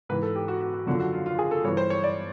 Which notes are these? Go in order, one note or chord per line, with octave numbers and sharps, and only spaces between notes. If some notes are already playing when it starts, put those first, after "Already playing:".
G#2 E3 B4
A4
G4
F#4
F#4
F#4
F#2 D3 F3 F#4
F#4
F4
F4
G#4
A4
G2 E3 C#5
C5
C#5
D5